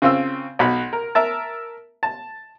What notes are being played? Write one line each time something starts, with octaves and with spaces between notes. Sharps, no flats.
C#3 C4 F4 E6
B1 F#4 B5
A#4
A#4 E5 A5
A5